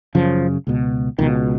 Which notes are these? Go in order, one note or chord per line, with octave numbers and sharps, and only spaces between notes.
F#2 C#3 F3
C#2 B2
C#2 B2 D#3